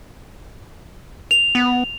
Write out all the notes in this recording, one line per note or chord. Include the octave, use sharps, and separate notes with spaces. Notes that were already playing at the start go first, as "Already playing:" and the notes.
F7
B3